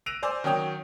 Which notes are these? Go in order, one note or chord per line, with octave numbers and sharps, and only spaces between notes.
E6 F#6 A#6 D7 D#7 F7
C5 D5 G#5 E6
D#3 F#3 C#4 G5 D#6 F7